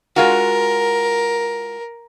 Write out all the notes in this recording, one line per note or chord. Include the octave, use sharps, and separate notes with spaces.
G#3 F4 F#4 A#4